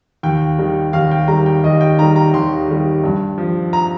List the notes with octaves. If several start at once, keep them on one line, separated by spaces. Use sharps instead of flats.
D#2 G5
D#3 G3
D#2 F5
G5
D#3 G3 A#5
G5
D#2 D#5
G5
D#3 G3 A#5
A#5
D#2 C6
D#3 G3
G2
F3
A#5